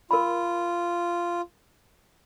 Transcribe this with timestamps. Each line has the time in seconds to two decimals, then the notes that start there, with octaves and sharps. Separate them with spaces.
0.11 F4 A#4 B5